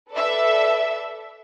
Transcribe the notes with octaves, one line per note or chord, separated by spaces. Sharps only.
A4 B4 D5 E5